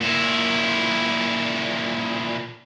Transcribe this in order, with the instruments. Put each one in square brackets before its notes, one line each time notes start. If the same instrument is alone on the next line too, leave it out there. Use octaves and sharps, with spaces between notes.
[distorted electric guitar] A#2 E4